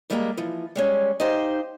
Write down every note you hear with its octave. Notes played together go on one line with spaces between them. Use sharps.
G2 G3 G#3 A#3 A5 A#5
E3 F3
G3 G#3 C#4
D#4 G4 C5 F5